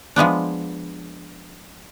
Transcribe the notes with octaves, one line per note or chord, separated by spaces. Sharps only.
F3 G#3 B3 D4